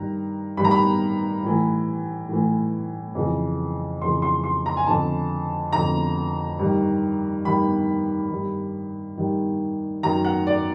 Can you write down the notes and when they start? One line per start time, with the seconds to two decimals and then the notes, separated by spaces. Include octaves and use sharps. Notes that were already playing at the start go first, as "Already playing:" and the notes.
Already playing: G2 D#3 A#5
0.57 G2 B5
0.61 D#3 A#5
0.71 B5
1.43 A2 E3
2.29 A2 E3
3.15 F2 C#3 E3
4.01 F2 C#3 E3 C6
4.22 C6
4.44 C6
4.66 A#5
4.77 G#5
4.87 F2 D3 A5
5.73 F2 D3 A#5
6.59 G2 D#3
7.45 G2 D#3 B5
8.31 G2 D#3
9.18 G2 D#3
10.03 F#2 D#3 A#5
10.25 F#5
10.47 D5